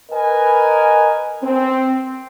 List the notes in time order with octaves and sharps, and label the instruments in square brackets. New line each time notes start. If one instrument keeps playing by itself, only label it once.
[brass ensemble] A#4 B4 D#5 G#5
C4